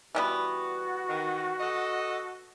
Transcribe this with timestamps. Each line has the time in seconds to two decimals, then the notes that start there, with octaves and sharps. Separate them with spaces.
0.15 E3 G3 B3 F#4
1.08 D#3
1.58 A4 D#5